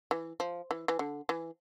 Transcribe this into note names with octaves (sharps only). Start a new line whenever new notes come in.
E3
F3
E3
E3
D3
E3